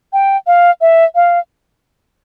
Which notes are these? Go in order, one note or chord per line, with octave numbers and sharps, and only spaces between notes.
G5
F5
E5
F5